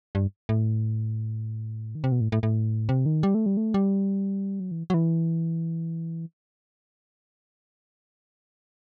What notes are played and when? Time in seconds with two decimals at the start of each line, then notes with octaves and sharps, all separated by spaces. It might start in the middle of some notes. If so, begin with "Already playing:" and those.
0.15 G2
0.49 A2
1.95 D#3
2.04 C3
2.12 B2
2.21 A2
2.32 A2
2.43 A2
2.89 C3
3.06 D#3
3.23 G3
3.35 A3
3.46 G3
3.57 A3
3.74 G3
4.60 F#3
4.71 E3
4.90 F#3
4.94 E3